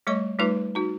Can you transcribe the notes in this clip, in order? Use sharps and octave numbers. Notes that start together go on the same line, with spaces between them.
G3 A3 C#5 D#5 C#6
G3 A3 D#4 F4 B4 D6
D#4 F#4